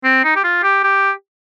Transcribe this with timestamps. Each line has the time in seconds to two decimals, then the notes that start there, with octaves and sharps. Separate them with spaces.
0.04 C4
0.24 D#4
0.36 G4
0.44 F4
0.63 G4
0.83 G4